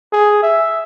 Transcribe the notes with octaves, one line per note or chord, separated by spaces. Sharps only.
G#4
E5